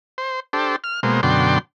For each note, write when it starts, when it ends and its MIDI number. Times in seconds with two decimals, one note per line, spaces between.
0.18 0.40 72
0.53 0.76 62
0.53 0.76 67
0.53 0.76 69
0.53 0.76 72
0.84 1.00 89
1.03 1.21 47
1.03 1.21 56
1.03 1.21 58
1.03 1.21 72
1.23 1.59 42
1.23 1.59 47
1.23 1.59 50
1.23 1.59 74
1.23 1.59 79
1.23 1.59 84